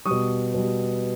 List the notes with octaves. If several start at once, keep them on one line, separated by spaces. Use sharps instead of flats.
G3 C#6 D#6
B2
B2 G3